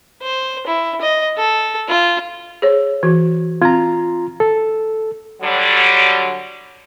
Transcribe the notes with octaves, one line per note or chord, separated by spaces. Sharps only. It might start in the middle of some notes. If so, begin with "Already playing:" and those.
C5
E4
D#5
A4
F4
G#4 C5 C#5
E3 F#4
C4 F4 A#5
A4
D3 F#3 G3